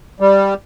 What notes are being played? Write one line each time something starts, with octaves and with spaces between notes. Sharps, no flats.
G3